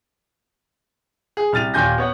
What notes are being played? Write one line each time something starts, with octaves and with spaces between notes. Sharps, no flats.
G#4
C2 F6 A6 D#7 F7
D#2 A#2 G#5 G6 A#6
B3 C#5 F#5